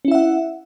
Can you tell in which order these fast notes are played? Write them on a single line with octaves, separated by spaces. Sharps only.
C#4 E4 E5 F#5